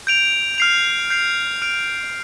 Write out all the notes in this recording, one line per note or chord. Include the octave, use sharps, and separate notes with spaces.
G6 D7 F7
F6 C7 F7
G6 C7 F7
F6 D7 F7